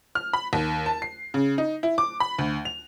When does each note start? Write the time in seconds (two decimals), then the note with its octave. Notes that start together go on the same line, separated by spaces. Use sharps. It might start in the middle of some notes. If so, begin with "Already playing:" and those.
0.15 F6
0.33 B5
0.53 D#2
0.86 A5
1.02 C7
1.34 C#3
1.58 D#4
1.83 E4
1.98 D6
2.20 B5
2.39 D2
2.65 F7